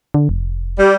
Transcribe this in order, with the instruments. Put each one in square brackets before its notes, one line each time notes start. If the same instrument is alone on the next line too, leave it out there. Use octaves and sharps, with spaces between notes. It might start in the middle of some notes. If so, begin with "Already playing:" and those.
[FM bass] D3
F1
[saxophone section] G3